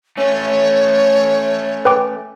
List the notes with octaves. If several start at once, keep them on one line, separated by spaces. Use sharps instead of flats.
A3 C#4 C#5
B4 G5 D6